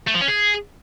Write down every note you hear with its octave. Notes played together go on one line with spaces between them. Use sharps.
A3
F3
C#4
G#4